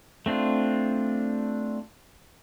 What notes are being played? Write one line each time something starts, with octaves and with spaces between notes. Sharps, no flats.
A3 C4 D4 F4